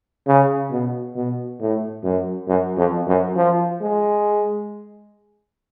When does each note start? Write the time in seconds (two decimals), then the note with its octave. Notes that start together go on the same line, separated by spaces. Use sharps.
0.27 C#3
0.71 B2
1.16 B2
1.60 A2
2.04 F#2
2.48 F#2
2.77 F2
3.07 F#2
3.37 F3
3.81 G#3